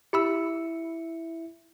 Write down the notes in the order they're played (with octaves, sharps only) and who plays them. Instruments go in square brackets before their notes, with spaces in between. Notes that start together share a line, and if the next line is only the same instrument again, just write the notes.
[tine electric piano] E4 E5 C#7 [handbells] G4 B5 E6